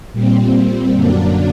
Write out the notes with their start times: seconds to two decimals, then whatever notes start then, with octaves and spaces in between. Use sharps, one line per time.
0.12 A#2 G3 C4
0.93 F#2 D3 F#3 A#3 D4